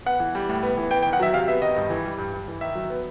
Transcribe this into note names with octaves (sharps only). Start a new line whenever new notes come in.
B3 F#5
E3
G3
A2
B3
E3
B3 G5
G5
D#3
F#5
F#3 E5
C3 F5
B3 E5
D#3 D#5
G2
E3
G3
G2
G2
E3
D#3 E5
F#3
B3